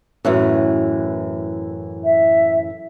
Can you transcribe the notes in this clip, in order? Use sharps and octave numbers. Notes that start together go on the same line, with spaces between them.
F#2 A2 E3
E5